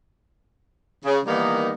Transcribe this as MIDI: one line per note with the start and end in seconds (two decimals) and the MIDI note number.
1.05 1.19 49
1.26 1.73 51
1.26 1.73 52
1.26 1.73 55
1.26 1.73 58
1.26 1.73 59
1.26 1.73 63